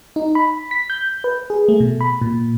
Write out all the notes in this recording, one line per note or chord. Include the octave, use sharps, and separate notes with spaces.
D#4
B5
B6
G6
B4
G#4
A3
B2
B5
A#2